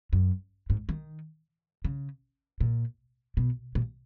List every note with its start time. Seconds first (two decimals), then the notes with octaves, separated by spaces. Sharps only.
0.13 F#2
0.70 G#2
0.89 D#3
1.84 C#3
2.60 A#2
3.37 B2
3.75 A#2